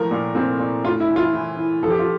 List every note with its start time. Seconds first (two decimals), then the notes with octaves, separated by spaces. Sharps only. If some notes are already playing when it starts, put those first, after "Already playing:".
Already playing: A2 F3 A#4
0.11 A#2
0.35 A#2 C4
0.59 A#2
0.84 A2 F4
1.00 E4
1.09 E3
1.16 F4
1.33 E3
1.57 E3
1.83 F3 A4
1.91 G4
1.99 F4